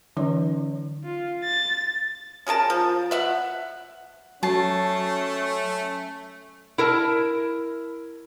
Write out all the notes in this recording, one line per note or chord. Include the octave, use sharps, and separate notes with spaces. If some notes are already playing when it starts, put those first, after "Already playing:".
D3 E3 F#3 C#4 D#4 C#5
F4
A6
C#4 G#4 A#4 A5
F3
B4 E5 F#5
F#3 A3 C#4 A5 C7
E4 A#4 A5